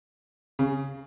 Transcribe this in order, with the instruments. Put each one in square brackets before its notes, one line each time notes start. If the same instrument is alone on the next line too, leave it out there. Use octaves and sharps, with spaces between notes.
[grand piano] C#3